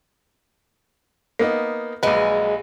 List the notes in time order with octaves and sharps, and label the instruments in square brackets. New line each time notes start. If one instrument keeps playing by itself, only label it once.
[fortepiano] A#3 B3 D#4
[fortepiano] A#1 B4 [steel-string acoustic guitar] F#3 G#3